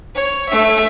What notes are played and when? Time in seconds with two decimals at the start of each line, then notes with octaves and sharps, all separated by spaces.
0.15 C#5
0.49 A3 E5